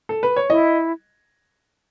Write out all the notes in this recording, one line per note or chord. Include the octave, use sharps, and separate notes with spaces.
A4
B4
C#5
E4 D#5